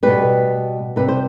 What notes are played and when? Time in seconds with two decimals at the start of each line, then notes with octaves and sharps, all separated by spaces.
0.03 B2 G3 B4
0.96 C3 G3 B4
1.08 C5